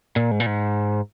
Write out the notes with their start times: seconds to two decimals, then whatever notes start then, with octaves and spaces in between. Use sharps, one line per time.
0.16 A#2
0.31 G#2
0.40 A#2
0.46 G#2